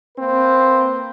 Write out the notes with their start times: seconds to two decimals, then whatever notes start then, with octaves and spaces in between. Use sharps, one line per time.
0.18 A#3 C4 B4